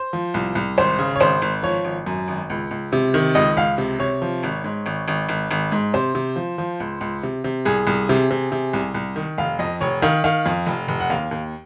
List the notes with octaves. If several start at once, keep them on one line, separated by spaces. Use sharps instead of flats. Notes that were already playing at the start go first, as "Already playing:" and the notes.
Already playing: C5
F3
C2
C2
G#1 C5
C#3
C#5
G#1 C5
G#1
F3 C#5
G#1
F#2
G#1
C#2
C#2
C3
D#3
C#2 D#5
C#2 F5
C3
C3 C#5
F3
G#1
G#2
G#1
G#1
G#1
G#1
G#2
C3 C5
C3
F3
F3
C#2
C#2
C3
C3
C2 G#4
C2
C3
C3
C3
C2
C2
D#3
F1 F5
F2 D#5
F1 C#5
D#3 F5
D#3 F5
F2
F1
F1
F#5
D#2 F5
D#2